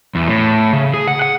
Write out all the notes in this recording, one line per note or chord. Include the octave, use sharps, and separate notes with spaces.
E2
A2
C#3
G#4
F#5
F#5